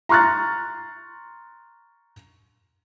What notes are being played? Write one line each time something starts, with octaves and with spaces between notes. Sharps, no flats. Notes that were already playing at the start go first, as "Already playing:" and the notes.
A#5 C6 C#6 F6 F#6 A6